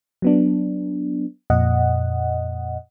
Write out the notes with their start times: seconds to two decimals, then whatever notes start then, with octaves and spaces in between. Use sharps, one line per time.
0.22 F#3 B3 D4
1.50 F2 A#2 D#5 F#5